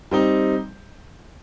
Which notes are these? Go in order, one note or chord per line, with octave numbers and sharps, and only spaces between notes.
G3 C4 D#4